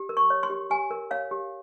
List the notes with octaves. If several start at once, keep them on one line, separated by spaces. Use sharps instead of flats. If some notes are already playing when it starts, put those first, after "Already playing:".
Already playing: G4
A#4
C#6
C#5
C6
G4
G4 G#5
A#4
C#5 F5
G4